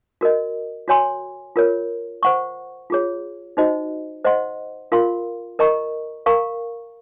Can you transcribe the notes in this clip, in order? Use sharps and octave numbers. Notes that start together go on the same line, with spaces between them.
F#4 A#4 D#5
F#4 C#5 G#5 C6
F4 A#4 C#5
C5 F#5 C#6
F4 G#4 C#5
D#4 F#4 C5 D#5
C5 D#5 F#5 C6
F4 A#4 F5 C6
A#4 D#5 A#5 C#6
A#4 F5 A#5 C#6